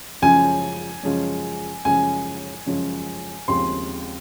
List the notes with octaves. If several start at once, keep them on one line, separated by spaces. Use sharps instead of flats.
F#2 C#3 F3 G#3 C#4 G#5
F#2 C#3 F3 G#3 C#4
F#2 C#3 F3 G#3 C#4 G#5
F#2 C#3 F3 G#3 C#4
D#2 C#3 F3 G#3 C4 C6